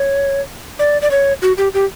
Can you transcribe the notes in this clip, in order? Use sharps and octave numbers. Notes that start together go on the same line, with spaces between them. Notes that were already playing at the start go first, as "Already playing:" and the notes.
Already playing: C#5
D5
D5
C#5
F#4
G4
G4